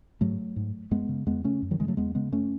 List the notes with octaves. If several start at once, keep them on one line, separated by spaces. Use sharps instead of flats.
G#2 F#3 A3
G#2
F#2 G#3 B3
C#3
E2 G#3 B3
C#3 A3 C#4
F#2
D#3 F#3
C#3 E3 G#3
F#3 A3
E2 G#3 B3
C#3 G#3 B3
F#2 A3 C#4